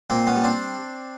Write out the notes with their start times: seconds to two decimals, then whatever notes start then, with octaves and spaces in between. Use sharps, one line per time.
0.10 A#2 A#3 C4
0.27 B3 C#4
0.36 G3
0.44 C4 D4